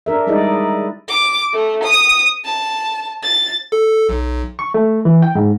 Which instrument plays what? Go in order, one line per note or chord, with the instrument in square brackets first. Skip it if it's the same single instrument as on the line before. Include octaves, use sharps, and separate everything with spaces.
[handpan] D4 A#4 E5
G3 G#3 D#4 E4 D5 D#5
[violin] D6
A3
D#6
A5
A6
[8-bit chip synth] A4
B1
[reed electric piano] C#6
A3
E3
G5
G#2